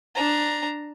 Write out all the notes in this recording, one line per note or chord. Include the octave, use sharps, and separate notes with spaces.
D4 A#5